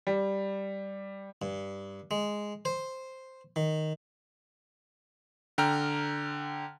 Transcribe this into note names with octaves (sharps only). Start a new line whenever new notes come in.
G3
G2
G#3
C5
D#3
D3 G5 A#5 F6